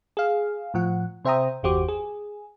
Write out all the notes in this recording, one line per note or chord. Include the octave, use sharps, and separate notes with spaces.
G#4 F5
A2 F3 F#5
C3 C5 E5 G5 A#5 D#6
G1 E2 F#4 G4 C5 D6
G#4